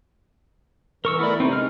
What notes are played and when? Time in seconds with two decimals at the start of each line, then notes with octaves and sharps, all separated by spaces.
1.05 E3 A#4 C#6 E6
1.19 A3 B3 E4 A#4 D5
1.40 C3 C4 D#4
1.53 G#3 F6